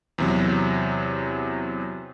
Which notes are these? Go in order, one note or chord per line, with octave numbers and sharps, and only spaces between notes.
E2 C3 F#3